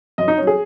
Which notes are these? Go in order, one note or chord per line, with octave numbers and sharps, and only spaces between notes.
F#2 D#5
D#4
F#3 C#4
G#4